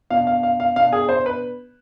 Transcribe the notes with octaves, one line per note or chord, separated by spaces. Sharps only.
B2 B3 D4 F5
F5
F5
F5
B2 B3 D4 F5
G#4
C5
B4